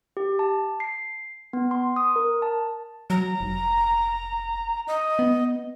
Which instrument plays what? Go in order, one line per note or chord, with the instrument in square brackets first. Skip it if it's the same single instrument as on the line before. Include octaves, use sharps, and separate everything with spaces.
[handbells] G4
A5
C7
B3
C6
D#6
A#4
A5
[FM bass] F#3 [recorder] A#5
[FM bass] F1
[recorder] D#5
[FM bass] B3